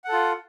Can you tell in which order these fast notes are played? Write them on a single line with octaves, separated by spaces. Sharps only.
F#5 A4 F4